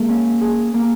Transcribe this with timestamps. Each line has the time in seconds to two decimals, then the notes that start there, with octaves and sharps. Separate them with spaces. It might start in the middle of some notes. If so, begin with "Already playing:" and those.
Already playing: G#3 A#3
0.09 C#4
0.41 G#4
0.74 A#3